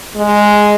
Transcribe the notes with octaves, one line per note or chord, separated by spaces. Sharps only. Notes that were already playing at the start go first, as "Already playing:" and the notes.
G#3